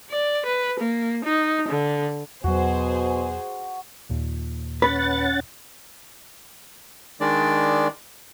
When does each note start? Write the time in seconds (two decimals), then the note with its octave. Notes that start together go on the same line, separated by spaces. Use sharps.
0.11 D5
0.45 B4
0.79 A#3
1.24 D#4
1.68 D3
2.44 E2 B2 F#3 F#4 G#4 C5
4.09 D#2 A#2
4.82 C#4 B4 F#5 A6
7.21 D#3 G#3 D4 D5